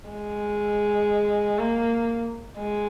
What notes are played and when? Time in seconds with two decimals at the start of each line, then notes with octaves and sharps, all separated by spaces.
0.09 G#3
1.58 A#3
2.58 G#3